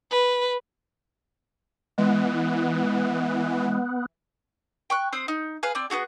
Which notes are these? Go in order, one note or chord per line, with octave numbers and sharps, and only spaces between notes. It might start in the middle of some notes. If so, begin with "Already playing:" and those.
B4
E3 G#3 B3
G5 C#6 F#6
C4 C5 D#6
D#4
G#4 B4 F5
C4 D5
B3 E4 F#4 G#4